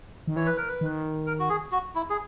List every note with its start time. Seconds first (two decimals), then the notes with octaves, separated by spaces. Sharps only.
0.28 D#3
0.36 E3 C#5
0.46 B4
0.58 A#4
0.68 B4
0.81 D#3
1.26 A#4
1.40 F#4
1.49 G#4
1.72 F#4
1.95 E4
2.10 G#4